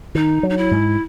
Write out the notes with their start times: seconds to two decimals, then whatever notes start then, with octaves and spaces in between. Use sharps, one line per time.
0.15 D#3 D#4
0.43 F#3
0.50 D#4
0.57 E4
0.71 G#2